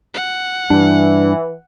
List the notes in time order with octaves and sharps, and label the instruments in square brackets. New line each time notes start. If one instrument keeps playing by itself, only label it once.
[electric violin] F#5
[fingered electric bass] G2 [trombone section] E3 [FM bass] D4